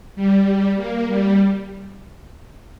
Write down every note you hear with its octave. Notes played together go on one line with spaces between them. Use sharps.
G3
A#3
G3